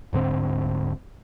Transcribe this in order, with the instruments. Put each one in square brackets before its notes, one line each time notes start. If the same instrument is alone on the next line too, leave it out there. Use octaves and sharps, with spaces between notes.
[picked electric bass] D1 G#2 D3 C4